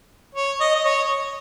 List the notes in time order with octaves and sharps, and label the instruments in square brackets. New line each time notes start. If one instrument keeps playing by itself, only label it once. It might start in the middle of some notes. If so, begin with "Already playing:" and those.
[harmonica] C#5
D#5
D#5
C#5